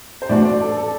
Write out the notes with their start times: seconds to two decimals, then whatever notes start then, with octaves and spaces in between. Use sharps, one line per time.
0.22 C5
0.29 A2 E3 A3 D4 F#4 D5
0.45 D5
0.61 A4
0.77 A4